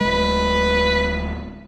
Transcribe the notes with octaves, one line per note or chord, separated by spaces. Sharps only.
D1 G#3 B4